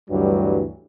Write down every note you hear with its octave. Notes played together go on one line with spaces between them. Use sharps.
D2 G2 E3 F#3 G3